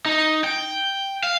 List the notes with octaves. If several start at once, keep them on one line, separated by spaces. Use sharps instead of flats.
D#4
G5
F5